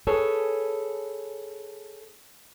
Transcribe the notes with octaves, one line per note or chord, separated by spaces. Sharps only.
G#4 A4 B4 C#5